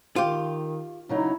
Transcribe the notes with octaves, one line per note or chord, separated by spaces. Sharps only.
D#3 F4 G4
C#3 F#3 D#4 E4